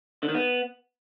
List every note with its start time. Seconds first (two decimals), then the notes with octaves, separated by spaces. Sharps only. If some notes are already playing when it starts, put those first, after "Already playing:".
0.23 D3
0.29 D#3
0.35 B3